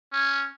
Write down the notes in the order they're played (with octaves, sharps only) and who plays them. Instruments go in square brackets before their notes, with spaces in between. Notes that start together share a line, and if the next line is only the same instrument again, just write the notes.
[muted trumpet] C#4